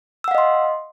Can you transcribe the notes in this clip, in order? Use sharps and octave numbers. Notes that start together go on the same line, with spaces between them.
D#5 F5 F#5 C6 E6